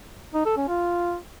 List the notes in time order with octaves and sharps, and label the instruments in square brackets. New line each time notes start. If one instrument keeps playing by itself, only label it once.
[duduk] D#4
A4
C#4
F4